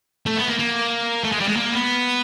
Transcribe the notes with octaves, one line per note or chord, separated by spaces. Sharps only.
A3
B3
A#3
A#3
A3
G#3
G3
G#3
A#3
B3